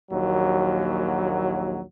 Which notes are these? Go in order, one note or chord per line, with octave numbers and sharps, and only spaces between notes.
A#1 D#2 F#3